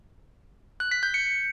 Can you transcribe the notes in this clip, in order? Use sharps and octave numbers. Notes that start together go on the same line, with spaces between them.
F#6
B6
G6
C#7